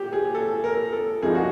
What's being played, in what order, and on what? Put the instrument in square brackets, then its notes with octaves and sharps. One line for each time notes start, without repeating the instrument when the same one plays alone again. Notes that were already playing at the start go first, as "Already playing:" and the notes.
Already playing: [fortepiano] A#2 F#4 G4
G#4
A4
A#4
A4
C2 C3 F3 A#3 D#4 G#4
F#4